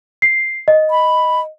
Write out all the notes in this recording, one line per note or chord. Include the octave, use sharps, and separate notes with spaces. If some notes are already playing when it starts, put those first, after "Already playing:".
C7
D#5
B5